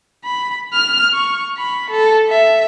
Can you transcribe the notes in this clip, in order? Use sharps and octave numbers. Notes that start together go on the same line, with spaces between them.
B5
F6
C#6
B5
A4
E5